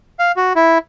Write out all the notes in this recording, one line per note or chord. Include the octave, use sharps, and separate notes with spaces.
F5
F#4
E4